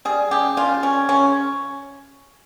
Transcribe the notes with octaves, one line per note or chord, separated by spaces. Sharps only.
G3 G#4
C#3 G4
C#3 F4
G3 C#4
C#3 C#4